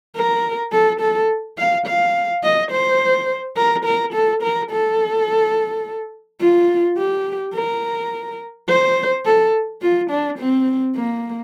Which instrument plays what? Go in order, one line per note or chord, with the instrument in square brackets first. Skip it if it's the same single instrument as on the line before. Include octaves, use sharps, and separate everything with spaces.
[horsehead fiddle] A#4
A4
A4
F5
F5
D#5
C5
A#4
A#4
A4
A#4
A4
F4
G4
A#4
C5
A4
F4
D4
C4
A#3